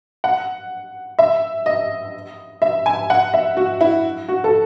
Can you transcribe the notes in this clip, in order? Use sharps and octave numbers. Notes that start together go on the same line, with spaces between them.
F#5
E5
D#5
E5
G#5
F#5
E5
F#4
E4
F#4
A4